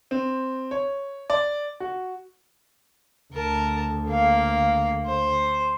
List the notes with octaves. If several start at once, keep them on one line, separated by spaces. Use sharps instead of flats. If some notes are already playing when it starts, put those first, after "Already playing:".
C4
C#5
D5
F#4
D2 A#4 A5
A#3 F5
C5